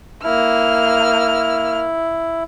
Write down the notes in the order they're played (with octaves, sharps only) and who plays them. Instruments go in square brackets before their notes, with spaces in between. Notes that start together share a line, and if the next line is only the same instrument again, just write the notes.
[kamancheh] A#3 F6 [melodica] E4